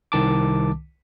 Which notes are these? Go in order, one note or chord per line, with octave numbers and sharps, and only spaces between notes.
C2 D#3 A5 D6